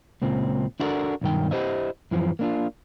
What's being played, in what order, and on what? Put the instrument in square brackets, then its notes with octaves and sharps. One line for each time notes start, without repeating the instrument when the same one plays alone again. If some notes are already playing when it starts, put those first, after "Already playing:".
[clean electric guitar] C#2 A#2 C4
D4 E4 F#4 A4 A#4 D5
B1 G2 D#3 G5
E4 G4 C5 D#5 E5
F#2 E3 F3
A#3 D4 F4